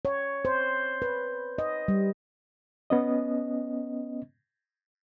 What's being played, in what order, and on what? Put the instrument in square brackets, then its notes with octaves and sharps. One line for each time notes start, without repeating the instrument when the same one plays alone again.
[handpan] C#5
C5
B4
D#5
G3
[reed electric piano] B3 C#4 D#5